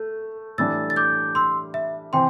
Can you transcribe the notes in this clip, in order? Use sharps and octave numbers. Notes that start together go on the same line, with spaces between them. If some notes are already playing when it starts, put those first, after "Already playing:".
Already playing: A3
A2 E3 G3 D4 E6 A6
A6
D6 G6
C6 E6
E5
C3 E3 G5 C6